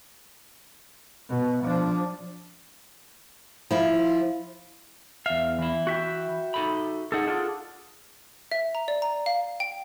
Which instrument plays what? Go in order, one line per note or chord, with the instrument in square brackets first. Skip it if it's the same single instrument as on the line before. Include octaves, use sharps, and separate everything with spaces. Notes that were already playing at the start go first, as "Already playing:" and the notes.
[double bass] B2
F3 D4
[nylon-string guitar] F3 E4 F4
[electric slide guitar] E2 F5 [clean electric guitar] E5
[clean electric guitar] E3 E4
[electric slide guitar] F#4 E5 G5
[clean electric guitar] D#4 A4 B5
[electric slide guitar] D#4 A4 [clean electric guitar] G#4 F#5
[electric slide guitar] D4 F4 A4
[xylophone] E5
A#5
D5
A#5
F5
G5